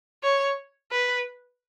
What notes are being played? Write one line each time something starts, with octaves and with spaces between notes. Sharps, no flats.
C#5
B4